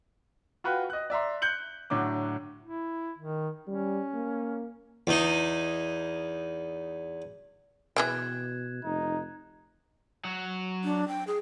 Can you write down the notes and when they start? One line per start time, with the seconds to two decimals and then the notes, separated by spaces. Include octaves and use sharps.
0.64 F4 F#4 B4 G5
0.90 D#5 F#6
1.10 D5 E5 A#5 C6
1.42 F#6 G6 C#7 F#7
1.90 A2 D3 F#3 D6
2.63 E4
3.18 D#3
3.67 G3 C#4
4.14 A#3
5.07 E2 D#4
7.96 B2 E3 G#4 G5 F#6 G#6 E7
8.84 F1 D#4
10.24 F#3 F#4
10.84 D4
11.08 G5
11.27 G#4